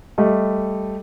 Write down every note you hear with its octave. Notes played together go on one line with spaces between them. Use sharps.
G3 A3 D#5